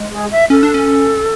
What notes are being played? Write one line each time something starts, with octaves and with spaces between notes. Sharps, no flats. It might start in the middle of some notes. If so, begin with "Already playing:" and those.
Already playing: G#3
G#4
E5
C#4 A4
D4
C#4